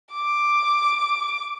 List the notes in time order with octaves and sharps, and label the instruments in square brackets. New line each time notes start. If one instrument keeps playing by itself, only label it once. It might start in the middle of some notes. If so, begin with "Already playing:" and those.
[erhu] D6